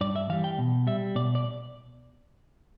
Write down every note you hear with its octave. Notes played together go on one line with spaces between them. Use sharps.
G2 D5
E5
E3 G3 F5
G5
B2
G3 E5
B2 D5
D5